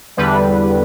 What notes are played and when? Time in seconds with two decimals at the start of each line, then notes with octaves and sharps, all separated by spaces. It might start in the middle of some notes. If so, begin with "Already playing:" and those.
0.17 E2 D3 G3 B4